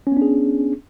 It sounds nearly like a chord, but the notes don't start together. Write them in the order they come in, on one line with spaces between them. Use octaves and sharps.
C#4 B3 D4 G#4